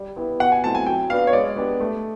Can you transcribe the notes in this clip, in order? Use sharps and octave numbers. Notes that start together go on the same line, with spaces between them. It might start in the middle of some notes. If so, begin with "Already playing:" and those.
Already playing: G3
B3 E4 G4 B4
B2 F#5
G#5
F#3 A3 C4 E4 A5
G#5
F#3 G5
B3 D4 F#4 B4 F5
C#5
G#3 D5
B3 D4 G4
A3